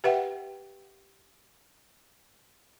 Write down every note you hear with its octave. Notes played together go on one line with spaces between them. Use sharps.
G4 B4 E5 F#5 G5